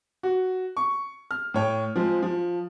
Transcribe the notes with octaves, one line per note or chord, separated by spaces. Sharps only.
F#4
C#6
F6
A2 C#5 G5
F3 G#3 C4
F3